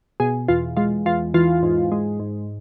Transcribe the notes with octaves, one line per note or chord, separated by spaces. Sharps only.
B2 G#4
E2 F4
G#3 F4
E2 F4
E3 F4
G#2
G#3
G#2